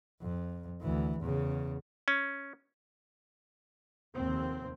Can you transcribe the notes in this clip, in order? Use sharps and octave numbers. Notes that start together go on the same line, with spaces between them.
F2
D2 E3
E2 C#3
C#4
F1 D#2 C4